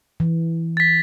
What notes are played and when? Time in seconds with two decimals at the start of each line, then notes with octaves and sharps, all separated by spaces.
0.20 E3
0.77 A6 B6